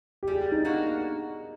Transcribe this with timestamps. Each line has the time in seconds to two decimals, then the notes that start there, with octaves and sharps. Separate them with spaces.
0.23 G4
0.28 G3 G#4
0.52 D#4
0.65 A#3 D4 F#4